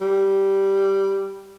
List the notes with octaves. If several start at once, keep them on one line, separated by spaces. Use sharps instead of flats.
G3